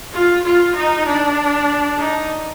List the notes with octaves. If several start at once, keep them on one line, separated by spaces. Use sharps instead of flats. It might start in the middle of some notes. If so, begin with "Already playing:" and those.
F4
F4
D#4
D4
D#4